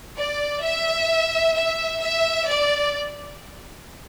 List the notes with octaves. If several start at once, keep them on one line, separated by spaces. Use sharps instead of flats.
D5
E5
E5
E5
D5